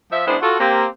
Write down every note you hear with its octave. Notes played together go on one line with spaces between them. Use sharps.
F3 E5
D#3 G#3 B3 D4 E4 C5
F4 F#4 A4
A#3 C4 G4